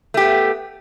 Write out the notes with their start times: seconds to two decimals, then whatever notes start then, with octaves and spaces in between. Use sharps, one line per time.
0.14 A3
0.17 G4
0.20 B3